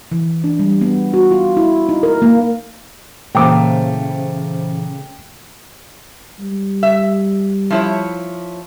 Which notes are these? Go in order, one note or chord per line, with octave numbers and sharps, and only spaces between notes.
E3
D4
G3
B3
F#4
F4
E4
D#4
A#4
A#3
A#2 C#3 E3 A3 A#3 C5 G5 D6
G3
E5
F3 E4 C#5